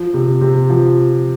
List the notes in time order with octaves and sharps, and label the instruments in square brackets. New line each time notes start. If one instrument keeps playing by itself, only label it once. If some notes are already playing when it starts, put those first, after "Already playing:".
Already playing: [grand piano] F3
C3
C3
F3